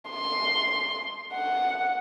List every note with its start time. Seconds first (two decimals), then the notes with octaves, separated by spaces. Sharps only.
0.10 C6
1.33 F#5